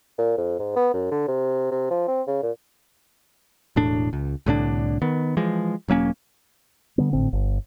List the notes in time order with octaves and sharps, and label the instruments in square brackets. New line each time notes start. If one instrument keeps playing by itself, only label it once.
[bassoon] A#2
F2
G#2
B3
F#2
D3
C3
C3
F3
C4
C#3
A#2
[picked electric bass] E1 A2 D4
C#2
C2 A2 D3 D4
D#3 B3
E3 F3 G#3
E1 F#3 A#3 C#4
[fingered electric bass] D3 G3 B3
G#1 A2 D3 C4
G1